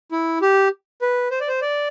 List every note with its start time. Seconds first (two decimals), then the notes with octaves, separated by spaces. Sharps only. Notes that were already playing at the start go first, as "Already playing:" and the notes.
0.12 E4
0.42 G4
1.02 B4
1.31 C5
1.40 D5
1.48 C5
1.61 D5